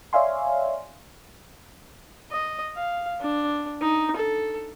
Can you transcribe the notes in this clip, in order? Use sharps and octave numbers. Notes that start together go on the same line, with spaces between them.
C#5 D5 E5 F5 G#5 C6
D#5
F5
D4
D#4
A4